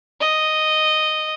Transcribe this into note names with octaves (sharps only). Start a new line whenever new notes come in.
D#5